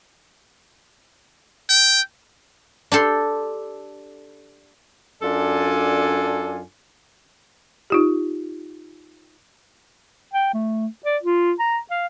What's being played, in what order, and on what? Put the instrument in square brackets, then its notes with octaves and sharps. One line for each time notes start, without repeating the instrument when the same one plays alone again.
[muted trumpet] G5
[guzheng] D4 G4 A4 C6
[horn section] F#2 D4 F4 A4 D5 G#5
[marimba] D#4 F4 G4
[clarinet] G5
A3
D5
F4
A#5
F5